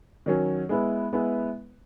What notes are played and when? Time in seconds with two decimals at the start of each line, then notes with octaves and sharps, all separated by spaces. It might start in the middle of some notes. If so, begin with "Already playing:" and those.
0.26 D#3 F#3 C#4
0.69 G#3 B3 E4 B4
1.13 G#3 B3 E4 B4